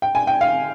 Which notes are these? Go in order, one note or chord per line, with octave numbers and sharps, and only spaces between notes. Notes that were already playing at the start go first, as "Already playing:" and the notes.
G5
G#5
G5
F5